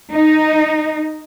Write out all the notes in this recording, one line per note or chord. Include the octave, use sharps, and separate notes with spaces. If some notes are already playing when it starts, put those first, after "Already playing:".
D#4